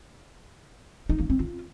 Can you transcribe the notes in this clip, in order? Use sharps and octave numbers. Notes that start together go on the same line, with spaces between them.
D#4
A#3
C4
F4